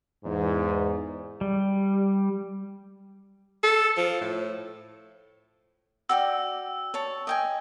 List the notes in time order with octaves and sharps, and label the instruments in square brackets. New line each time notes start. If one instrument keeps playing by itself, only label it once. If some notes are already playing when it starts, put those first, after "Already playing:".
[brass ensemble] E2 G#2
[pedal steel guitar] G3
[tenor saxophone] A4
F3
A2
[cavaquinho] F#4 D5 G5 [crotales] E6
[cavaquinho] C#5 A5
D#5 G5 G#5